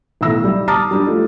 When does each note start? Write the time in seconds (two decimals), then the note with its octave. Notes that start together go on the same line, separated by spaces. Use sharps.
0.21 B1 A2 D#3 E5 E6 A#6
0.44 G3 D#4
0.68 A5 A#5 D6 D#6 F6 A6
0.91 G3 D4 G4
1.07 F3 A3 D#4